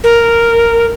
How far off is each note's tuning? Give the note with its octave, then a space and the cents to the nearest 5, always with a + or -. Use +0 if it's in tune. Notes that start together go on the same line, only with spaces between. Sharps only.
A#4 -5